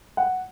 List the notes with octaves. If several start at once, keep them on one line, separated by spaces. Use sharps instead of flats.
F#5